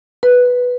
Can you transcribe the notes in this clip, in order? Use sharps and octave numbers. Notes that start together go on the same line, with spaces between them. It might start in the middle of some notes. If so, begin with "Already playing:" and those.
B4